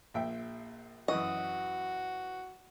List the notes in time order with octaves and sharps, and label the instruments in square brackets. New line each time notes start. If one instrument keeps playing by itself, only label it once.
[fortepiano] A#1 E5 G5
[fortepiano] F#2 E3 C#6 [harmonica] F#4 [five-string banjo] D#5